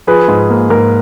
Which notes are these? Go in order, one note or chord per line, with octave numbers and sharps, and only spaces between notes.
F3 G#4 B4
G#2
A#3
G#2 A#4